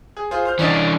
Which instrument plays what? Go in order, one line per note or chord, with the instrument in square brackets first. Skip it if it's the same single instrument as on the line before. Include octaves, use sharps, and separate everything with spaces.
[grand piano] G#4
F4 G#4 C5
C5 F6 G6
[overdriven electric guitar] E3 D4 [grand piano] C#4 D5 D#5